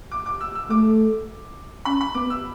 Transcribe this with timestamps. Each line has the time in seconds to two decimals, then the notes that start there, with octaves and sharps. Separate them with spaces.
0.11 D6
0.26 D6
0.41 E6
0.55 E6
0.70 A3 D6
1.85 C#4 B5
2.01 B5
2.15 B3 D6
2.30 E6